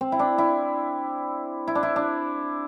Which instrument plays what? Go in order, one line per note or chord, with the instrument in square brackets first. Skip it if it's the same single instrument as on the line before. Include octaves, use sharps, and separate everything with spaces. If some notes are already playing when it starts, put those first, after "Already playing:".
[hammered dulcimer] C4
E4
D4
E4
E4
D4
E4
D4